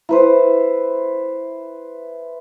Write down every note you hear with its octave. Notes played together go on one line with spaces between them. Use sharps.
E4 B4 C5